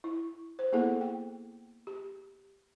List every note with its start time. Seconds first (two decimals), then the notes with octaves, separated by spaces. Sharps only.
0.04 E4
0.59 C5
0.73 A#3 B3 E4 G#4 A4 F#5
1.01 G5
1.87 G4